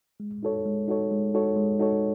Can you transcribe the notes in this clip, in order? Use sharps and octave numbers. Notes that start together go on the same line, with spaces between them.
G#3
D#4 F#4 A4 C#5
G#3
D#4 F#4 A4 C#5
G#3
D#4 F#4 A4 C#5
G#3
D#4 F#4 A4 C#5